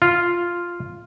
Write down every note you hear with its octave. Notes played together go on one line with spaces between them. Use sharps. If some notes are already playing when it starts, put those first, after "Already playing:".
F4